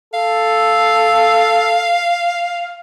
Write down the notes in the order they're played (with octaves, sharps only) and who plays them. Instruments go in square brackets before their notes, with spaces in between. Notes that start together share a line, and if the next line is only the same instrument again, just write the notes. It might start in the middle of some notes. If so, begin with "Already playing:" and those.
[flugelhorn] A4 [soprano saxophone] F5